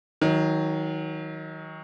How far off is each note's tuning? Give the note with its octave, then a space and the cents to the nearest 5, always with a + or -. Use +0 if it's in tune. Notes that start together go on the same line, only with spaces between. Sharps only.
D#3 +30 F#3 +0